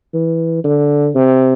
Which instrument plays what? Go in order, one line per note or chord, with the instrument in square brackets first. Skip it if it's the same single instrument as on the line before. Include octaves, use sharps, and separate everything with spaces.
[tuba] E3
D3
C3